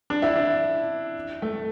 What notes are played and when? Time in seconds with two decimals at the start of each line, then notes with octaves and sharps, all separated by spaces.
0.10 D4
0.22 E4
0.36 D4
1.42 A3